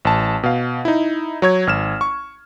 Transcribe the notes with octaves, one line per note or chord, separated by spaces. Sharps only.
A1 A5
B2 F5
D#4 E4
F#3 C#5 G#6
G#1 F6 E7
C#6